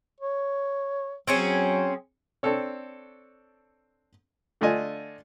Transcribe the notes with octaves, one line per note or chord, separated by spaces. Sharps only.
C#5
F#3 C4 C#4 G#4
C4 D4 A4 C#5
D3 A3 D4 F4 D#5 G#5